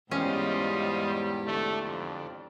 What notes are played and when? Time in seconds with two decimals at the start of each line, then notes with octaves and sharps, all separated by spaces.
0.11 E2 G#2 G3 C#4 F4 G4 C5 D#5
1.46 D3 A3
1.83 F2